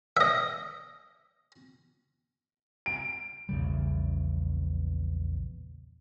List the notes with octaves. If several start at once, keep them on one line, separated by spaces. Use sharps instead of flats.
D#5 E5
D7
A#1 E2 C#3 G3